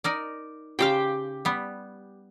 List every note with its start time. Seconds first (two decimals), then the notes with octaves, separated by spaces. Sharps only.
0.04 D#4 A#4 D5
0.79 C#3 G4 C5 F5 G5
1.45 G3 B3